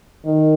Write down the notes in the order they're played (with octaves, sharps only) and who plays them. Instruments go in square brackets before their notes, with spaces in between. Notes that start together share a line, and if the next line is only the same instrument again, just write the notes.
[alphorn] D#3